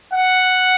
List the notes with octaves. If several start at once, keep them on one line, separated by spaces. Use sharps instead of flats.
F#5